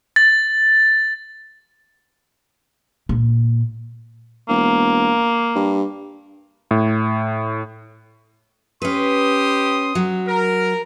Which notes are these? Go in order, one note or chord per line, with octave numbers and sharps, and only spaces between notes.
A6
A#2
E1 A#3
G2
A2
C#4 G4 B4 C6 D#6
F#3
A#4